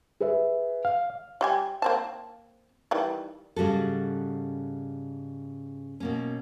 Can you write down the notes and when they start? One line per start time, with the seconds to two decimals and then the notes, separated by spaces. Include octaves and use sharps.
0.20 G#4 B4 E5
0.85 F5
1.41 G3 G4 G#5
1.82 A#3 C4 A5
2.91 D#3 E3 G3
3.56 G#2 C#3 G3 F#4 A4
6.00 B2 A#3 C#4